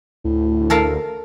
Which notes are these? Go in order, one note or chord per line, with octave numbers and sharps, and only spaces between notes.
D2 A2
A4 A#4 F5